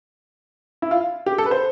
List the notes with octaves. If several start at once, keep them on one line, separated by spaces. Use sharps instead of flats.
E4
F4
G4
A4
B4
C5